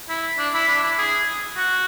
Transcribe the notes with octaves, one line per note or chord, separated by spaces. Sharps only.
E4
D4
E4
D4
E4
G#4
F#4